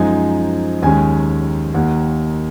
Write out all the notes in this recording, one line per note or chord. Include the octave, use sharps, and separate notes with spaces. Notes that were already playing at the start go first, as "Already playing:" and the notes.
Already playing: F#2 F3 G#3 D#4 G#5
D#2 D#3 G#3 C#4 G#5
D#2 D#3 A#3 F#5